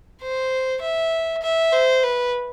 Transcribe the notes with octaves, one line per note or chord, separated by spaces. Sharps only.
C5
E5
E5
C5
B4